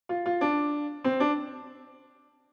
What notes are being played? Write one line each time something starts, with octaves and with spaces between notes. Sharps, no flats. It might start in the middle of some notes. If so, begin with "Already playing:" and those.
F4
F4
D4
C4
D4